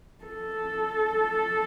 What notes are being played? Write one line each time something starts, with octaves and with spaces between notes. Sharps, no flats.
A4